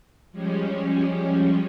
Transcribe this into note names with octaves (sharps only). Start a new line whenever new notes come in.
F3 G3 G#3 C#4